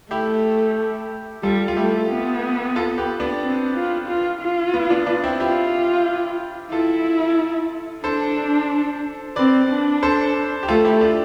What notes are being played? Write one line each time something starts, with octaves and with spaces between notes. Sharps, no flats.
A3 E4 G4
G3 F4 A4
F4
A3 E4 G4
B3
F4 A4
G4 B4
B3 D4
C4
F4
F4
F4
B3
B3 D4
B3 D4
C4 E4
E4 F4 G4
E4 F4 A4
D4 A4 C5
C4 B4 D5
D4
A4 C5
G4
A3 F4 A4
E4 G4
D4 F4